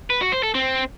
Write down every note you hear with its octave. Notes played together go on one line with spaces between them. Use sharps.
B4
F#4
C5
A4
C4